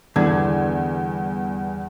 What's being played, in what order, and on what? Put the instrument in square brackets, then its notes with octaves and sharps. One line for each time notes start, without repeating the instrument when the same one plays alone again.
[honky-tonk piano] E2 G2 G#6 [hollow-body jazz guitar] D3